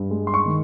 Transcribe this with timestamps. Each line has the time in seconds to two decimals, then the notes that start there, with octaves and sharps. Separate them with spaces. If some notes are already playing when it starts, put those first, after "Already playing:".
Already playing: G2
0.10 G#3
0.27 C6
0.34 C#6
0.45 D#3